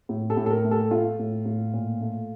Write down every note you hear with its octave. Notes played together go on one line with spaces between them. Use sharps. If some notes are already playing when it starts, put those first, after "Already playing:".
A2
A4
A2
A4
A#4
A3
A4
A3 F4
A2
A2
A#2
A3